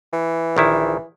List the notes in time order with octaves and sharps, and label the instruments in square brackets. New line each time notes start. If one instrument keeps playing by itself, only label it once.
[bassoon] E3
[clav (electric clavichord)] A#1 D#3 E4